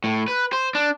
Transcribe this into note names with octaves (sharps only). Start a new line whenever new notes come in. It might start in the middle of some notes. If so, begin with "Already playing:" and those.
A2
B4
C5
D4